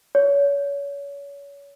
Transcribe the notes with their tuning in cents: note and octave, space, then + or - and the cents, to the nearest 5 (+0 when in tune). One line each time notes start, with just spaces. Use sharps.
C#5 +30